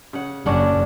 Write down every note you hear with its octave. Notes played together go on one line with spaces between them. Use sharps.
C#3 F#5
F#1 C#4 D4 F#5